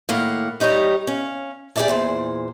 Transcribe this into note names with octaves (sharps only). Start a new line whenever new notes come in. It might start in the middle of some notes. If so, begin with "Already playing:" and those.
A2 D#3 A#3 F5 F#5
G3 D#4 G4 C#5 D#5
C#4 F5
G4 G#4 C5 D5 E5 A5
E2 A#2 C5